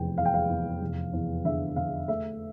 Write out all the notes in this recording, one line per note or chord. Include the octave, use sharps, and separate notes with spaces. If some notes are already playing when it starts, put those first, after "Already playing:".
Already playing: F1 E2 G5
E2 F5
G5
F5
E2
F1
E2
D3 E5
D3 F5
A3 E5